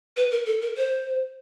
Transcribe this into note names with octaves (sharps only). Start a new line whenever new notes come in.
B4
A#4
A4
A#4
C5